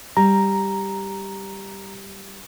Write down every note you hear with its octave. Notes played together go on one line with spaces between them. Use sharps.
G3 A#5